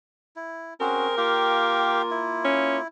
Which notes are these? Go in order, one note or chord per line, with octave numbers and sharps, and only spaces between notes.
E4
C4 C#4 F#4 G#4 A#4 C5
A#3 F4 G4 F5 G5
E4
C#4